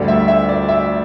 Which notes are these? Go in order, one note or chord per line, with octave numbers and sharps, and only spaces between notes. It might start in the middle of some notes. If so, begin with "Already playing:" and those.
Already playing: D2 D3 G3 D5
E5
E5
D5
E5